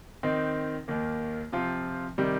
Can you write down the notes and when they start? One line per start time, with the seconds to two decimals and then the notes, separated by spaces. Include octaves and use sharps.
0.23 D#3 C4 D#4
0.88 D#2 D#3 A#3
1.52 C3 F3 C4 F4
2.18 C3 D#3 G3